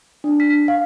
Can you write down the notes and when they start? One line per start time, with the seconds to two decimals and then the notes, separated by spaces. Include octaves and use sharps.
0.24 D4
0.40 B6
0.68 F5